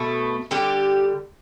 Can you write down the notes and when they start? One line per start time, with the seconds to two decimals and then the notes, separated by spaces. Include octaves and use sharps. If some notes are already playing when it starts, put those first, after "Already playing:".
Already playing: B2 A3
0.51 D3 G3 G4